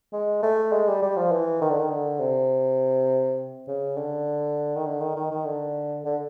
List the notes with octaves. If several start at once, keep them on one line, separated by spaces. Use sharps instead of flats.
G#3
A3
G#3
G3
G3
F3
E3
D#3
D3
D#3
D3
C3
C#3
D3
D#3
D3
D#3
D#3
D#3
D3
D3